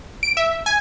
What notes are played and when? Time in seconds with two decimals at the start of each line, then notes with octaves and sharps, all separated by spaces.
0.23 D7
0.37 E5
0.66 G#5